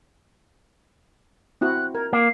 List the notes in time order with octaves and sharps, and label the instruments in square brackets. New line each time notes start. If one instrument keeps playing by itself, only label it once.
[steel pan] C4 E4 F#4 [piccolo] F#6
[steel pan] A#4 [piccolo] G#6
[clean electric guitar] A#3 [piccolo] C7